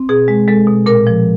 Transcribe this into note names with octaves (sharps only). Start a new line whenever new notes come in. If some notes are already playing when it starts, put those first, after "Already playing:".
Already playing: C4
B2 G#4
G#3
G#3 A4
B2
A#2 A#4
F3